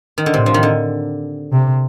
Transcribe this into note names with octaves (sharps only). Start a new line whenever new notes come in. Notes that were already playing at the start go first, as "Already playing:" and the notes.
D#3
D3
A2 C3
F3
D#3
D3
C3